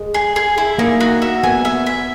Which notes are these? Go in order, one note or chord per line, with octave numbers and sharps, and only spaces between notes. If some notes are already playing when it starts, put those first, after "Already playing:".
Already playing: G#3
G#4
G#4
E4
A#3 D#4
F#4
E5
B3 G#5
E5
E5